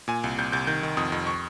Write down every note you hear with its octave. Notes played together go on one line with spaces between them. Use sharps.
A#2 G#5
C2
C2 G6
C2 G6
D#3 G6
D#3
F2 D#6
F2
C#6